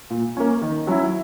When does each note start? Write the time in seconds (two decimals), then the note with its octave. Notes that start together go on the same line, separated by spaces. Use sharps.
0.10 A#2
0.37 A#3 C#4
0.61 D#3
0.87 F#3 C#4 E4